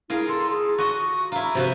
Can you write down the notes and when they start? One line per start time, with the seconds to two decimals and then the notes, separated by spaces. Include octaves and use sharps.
0.10 E4 F4 G#4 A#4
0.29 A4 C6
0.50 G#4
0.78 F#4 D#5 C#6
1.32 E4 F4 A#5
1.55 C3 F3 F#4 B4